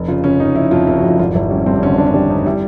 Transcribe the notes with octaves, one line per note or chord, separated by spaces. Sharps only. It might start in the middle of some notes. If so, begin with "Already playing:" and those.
Already playing: F1
C#3 F4
C#3 C#4
F1 D#4
F1 E4
F2 F4
F1 E4
F#4
F1
F4
G#1 F4
G#1 E4
G3 C#4
G2 C4
D3 C#4
G#1 D4
C#4
G3 D4
G2 D#4
G3 E4